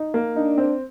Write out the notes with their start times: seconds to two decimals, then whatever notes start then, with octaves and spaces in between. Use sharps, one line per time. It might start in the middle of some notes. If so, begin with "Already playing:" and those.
Already playing: D#4
0.14 A#3
0.36 D4 D#4
0.58 C4